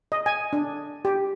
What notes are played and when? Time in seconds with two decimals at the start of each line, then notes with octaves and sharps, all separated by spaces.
0.12 D#5
0.26 G#5
0.53 D4
1.05 G4